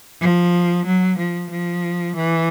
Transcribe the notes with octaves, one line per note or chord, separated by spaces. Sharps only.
F3
F#3
F3
F3
E3